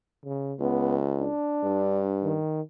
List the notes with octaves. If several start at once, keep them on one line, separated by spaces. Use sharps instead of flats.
C#3
C#2 B3
D4
G2
D#3